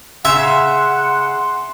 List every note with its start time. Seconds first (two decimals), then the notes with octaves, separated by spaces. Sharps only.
0.25 C#3 E5 F#5 C6